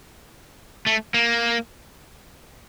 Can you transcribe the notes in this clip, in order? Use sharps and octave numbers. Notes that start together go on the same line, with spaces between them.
A3
A#3